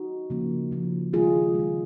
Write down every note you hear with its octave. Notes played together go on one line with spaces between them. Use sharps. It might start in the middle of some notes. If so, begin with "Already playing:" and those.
Already playing: D#4 F#4
C#3 F3 A#3
C#3 F3 A#3
D#3 G#3 F4 G#4
D#3 G#3